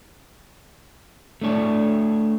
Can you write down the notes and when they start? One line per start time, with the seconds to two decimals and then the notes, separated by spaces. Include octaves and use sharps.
1.41 A3 D4 C#5